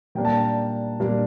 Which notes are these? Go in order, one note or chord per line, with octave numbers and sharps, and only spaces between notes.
A#2 G3 A#3 D4 G5
A5
G5
A#2 G3 A#3 D4